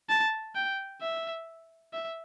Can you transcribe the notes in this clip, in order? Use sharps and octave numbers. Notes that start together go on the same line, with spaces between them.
A5
G5
E5
E5